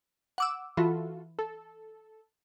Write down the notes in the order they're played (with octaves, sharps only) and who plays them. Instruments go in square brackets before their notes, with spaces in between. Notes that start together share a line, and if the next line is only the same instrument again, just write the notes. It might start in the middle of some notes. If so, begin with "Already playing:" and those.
[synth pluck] F#5 D6 E6
[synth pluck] E3 [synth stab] F4 F#4 A4
[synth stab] A4